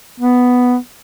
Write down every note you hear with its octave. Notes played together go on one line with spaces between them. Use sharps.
B3